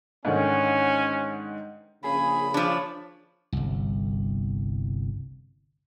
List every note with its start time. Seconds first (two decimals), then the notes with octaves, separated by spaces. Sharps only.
0.25 G#2 D3 D#3 C#4
2.04 A#1 C#3 G#4 B5
2.54 F3 D4 C#5
3.53 G1 C2